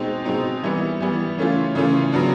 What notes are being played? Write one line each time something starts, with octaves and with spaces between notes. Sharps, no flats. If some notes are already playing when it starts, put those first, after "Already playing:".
Already playing: B2 G#3 C4 D#4
B2 G#3 C4 D#4
E3 G3 B3
E3 G3 B3
C#3 E3 A3 C#4 F4
C#3 E3 A3 C#4 F4
C#3 F#3 B3 D4